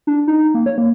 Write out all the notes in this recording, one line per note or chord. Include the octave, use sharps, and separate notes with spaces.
D4
D#4
A#3
C#5
A#3